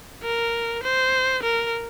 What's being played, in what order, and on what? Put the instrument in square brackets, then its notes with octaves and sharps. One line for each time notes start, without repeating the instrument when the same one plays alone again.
[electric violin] A#4
C5
A#4